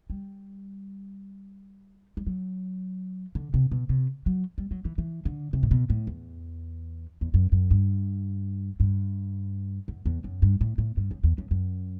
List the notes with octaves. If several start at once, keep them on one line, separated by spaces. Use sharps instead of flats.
G3
G3
F#3
D3
C3
B2
C3
F#3
G3
F#3
E3
E3
D3
C3
A2
B2
A2
E2
E2
F#2
F#2
G2
G2
F#2
E2
F#2
G2
A2
A2
G2
F#2
E2
F#2
F#2